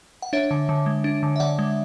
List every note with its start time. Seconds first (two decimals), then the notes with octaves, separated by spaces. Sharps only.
0.22 F#5
0.33 D4 C#5 E5
0.51 D3
0.69 D3
0.86 G#3
1.04 D4
1.23 D3
1.36 E5
1.40 D3 D5 F#5
1.59 G#3